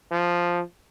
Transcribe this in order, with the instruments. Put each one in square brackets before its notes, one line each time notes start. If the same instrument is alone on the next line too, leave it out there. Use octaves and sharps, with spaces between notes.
[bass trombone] F3